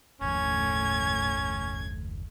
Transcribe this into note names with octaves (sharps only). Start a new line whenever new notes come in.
F#1 D#2 A2 F3 C#4 G#6